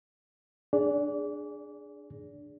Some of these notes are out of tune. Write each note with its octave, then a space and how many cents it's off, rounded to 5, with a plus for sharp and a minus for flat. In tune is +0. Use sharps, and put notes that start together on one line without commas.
D4 +10 G#4 +0 D5 -30